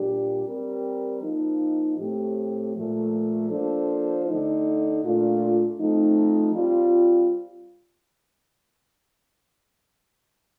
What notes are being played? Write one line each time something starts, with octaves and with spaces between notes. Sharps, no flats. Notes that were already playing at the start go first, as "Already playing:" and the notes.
Already playing: A#2 G3 D4 G4
G3 C4 G4 A#4
F3 A#3 D#4
A2 A3 C4 G4
A#2 F3 A3
F3 A#3 D4 A4 C5
D3 A3 D#4
A#2 A3 D4 F4
F3 A3 C4 D#4
G3 C4 F4